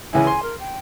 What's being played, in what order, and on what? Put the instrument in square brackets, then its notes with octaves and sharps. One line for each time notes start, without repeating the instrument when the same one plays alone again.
[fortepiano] C#2 E3 E4 [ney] G#5
[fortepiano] C6
[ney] A#4
G5